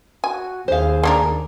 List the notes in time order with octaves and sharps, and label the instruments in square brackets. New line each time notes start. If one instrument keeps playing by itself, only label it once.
[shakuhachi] F#4 [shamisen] G#5
[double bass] D#2 [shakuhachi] G#4 [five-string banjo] C5 F5
[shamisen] A#3 D4 A#4